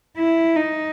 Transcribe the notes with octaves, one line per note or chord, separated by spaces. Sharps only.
E4
D#4